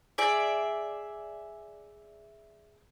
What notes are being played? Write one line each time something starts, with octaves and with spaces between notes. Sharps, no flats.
G#4 D5 E5